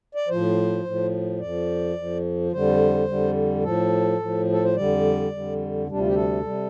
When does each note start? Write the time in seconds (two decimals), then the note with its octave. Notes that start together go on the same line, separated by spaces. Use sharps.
0.15 D5
0.28 A2 F3 C5
0.84 A2 F3
1.40 F2 F3 D5
1.96 F2 F3
2.52 F2 D3 G3 C5
3.08 F2 D3 G3
3.63 A2 F3 A4
4.19 A2 F3
4.52 A4
4.64 C5
4.76 F2 D3 G3 D5
5.31 F2 D3 G3
5.87 D2 C3 G3 D4
5.99 F4
6.07 G4
6.15 A4
6.43 C3 G3